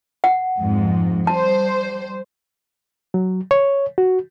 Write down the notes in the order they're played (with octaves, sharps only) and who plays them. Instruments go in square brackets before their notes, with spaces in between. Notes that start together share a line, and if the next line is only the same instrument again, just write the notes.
[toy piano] F#5
[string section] F2 G#2
[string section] G3 C5 [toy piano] A5
[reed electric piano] F#3
C#5
F#4